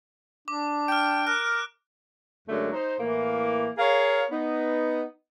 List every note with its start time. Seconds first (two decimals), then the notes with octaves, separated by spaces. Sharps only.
0.48 D4 D6
0.88 G5 F6 D7
1.27 A#4 F#6
2.49 F#2 D3 F#3 G#3 A3
2.72 D#4 C5
2.99 A2 E3 A#3
3.78 G#4 A#4 C#5 F5
4.31 B3 D#4